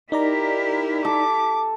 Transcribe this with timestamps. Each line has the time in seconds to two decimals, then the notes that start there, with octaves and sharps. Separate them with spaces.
0.12 D#4 E4 G4 A#4 D5 A#5
1.05 A4 D6